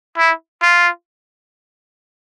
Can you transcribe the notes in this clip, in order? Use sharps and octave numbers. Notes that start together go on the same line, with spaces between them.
E4
F4